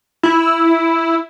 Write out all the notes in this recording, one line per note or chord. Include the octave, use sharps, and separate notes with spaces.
E4